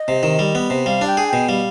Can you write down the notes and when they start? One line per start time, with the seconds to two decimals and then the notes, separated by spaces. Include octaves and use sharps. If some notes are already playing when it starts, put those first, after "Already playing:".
Already playing: D#5
0.08 C3
0.23 D#3
0.39 G3
0.55 B3
0.70 C3
0.86 G3 F5
1.01 D4
1.07 G5
1.17 G#4
1.28 G5
1.33 B2
1.48 G3 F5